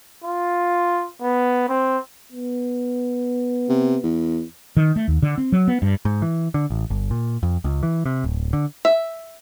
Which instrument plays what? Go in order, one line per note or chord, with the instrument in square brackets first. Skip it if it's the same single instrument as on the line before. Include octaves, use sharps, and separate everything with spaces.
[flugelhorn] F4
B3
C4
[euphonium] B3
[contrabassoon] C3
E2
[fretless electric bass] D#3
A3
D#2
D3
C4
F#3
B3
G2
[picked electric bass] G#2
E3
D3
A1
G1
A#2
F2
C#2
E3
C3
D1
D3
[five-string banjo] E5